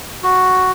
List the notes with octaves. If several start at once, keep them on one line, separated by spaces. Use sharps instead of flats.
F#4